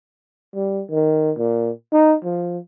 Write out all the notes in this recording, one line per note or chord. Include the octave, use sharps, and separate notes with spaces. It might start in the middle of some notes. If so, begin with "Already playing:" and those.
G3
D#3
A#2
D#4
F3